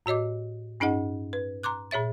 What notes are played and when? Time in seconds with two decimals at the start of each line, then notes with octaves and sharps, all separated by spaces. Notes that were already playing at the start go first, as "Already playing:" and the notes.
0.06 A2 F#4 C#5 D#5 D6
0.80 G2 C#4 D#4 G#4 D#5 F#5
1.33 B4
1.63 A#5 C6 D6 F#6
1.91 A#2 G#4 C#5 E5 A6